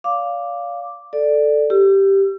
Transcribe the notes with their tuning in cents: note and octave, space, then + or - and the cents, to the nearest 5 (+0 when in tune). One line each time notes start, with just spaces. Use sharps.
D5 -45 F5 +0 D6 +0
A4 +0 D5 +10
G4 -5 E6 +40